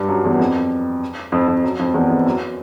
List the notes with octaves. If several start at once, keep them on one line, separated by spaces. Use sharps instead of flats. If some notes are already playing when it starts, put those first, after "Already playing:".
Already playing: G2
F#2
E2
F2
F2
F2
F#2
F2
E2
F2
F#2